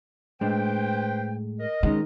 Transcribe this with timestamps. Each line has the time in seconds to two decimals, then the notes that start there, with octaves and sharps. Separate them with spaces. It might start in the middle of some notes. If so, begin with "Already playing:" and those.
0.41 A2 G#3 D4 B4 C5 G5
1.60 A#4 D#5
1.83 D#3 G#3 C#4